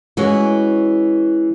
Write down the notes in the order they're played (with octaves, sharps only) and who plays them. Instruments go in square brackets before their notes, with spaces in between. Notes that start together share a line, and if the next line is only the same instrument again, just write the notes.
[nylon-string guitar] E3 G#3 C#4 F#4